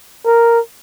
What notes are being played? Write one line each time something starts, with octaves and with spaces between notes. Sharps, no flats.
A#4